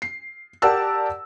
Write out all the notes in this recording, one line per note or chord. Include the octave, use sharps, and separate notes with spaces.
C7
G4 A#4 D5 F#5 A5 E6